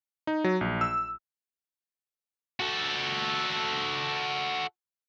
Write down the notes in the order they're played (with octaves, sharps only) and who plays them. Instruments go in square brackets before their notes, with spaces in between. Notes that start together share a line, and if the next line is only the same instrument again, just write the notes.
[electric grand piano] D#4
F#3
A#1
E6
[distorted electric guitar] F#4 A4